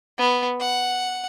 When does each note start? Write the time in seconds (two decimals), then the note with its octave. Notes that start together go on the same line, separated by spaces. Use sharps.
0.18 B3
0.60 F#5